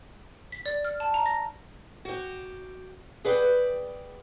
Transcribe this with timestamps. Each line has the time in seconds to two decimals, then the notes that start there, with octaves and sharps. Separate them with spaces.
0.52 B6
0.66 D5
0.85 F6
1.00 A5
1.14 A#5
1.26 A#6
2.05 F#4 G4
3.25 G#4 B4 D5 F#5 G5